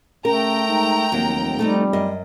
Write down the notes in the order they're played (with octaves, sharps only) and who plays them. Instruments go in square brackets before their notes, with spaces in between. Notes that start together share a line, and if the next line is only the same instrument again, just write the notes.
[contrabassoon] C#3 [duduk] A3 [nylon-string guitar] A#4 [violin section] G5 A#5
[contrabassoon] G#2
[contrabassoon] F1 [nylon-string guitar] D#2 F#3
[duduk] G3 [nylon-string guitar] A3 C4 D#4
[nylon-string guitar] F#2 D#5